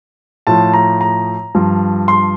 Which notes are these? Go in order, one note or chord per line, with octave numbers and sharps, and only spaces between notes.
A2 F3 A5
A#5
A#5
G2 F3
C6